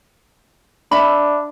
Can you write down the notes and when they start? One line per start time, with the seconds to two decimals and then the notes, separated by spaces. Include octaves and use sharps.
0.91 D4 E5 B5